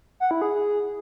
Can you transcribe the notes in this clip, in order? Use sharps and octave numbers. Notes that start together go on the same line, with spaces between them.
F#5
E4
G#4